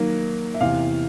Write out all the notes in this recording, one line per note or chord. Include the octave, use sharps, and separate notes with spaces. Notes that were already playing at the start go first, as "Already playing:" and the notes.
Already playing: D#3 F#3 A#3
E5
E2 C3 E3 F5